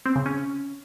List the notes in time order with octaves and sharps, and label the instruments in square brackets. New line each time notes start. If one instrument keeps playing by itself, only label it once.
[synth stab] C4
C#3
C#4